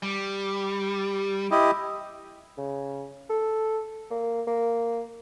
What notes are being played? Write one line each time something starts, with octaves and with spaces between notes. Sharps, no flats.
G3
E4 G4 D#5
C#3
A4
A#3
A#3